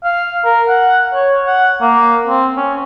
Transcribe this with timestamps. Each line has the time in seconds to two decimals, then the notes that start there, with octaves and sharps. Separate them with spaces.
0.04 F5
0.45 A#4
0.68 F#5
1.14 C#5
1.46 F#5
1.81 A#3
2.27 C4
2.57 C#4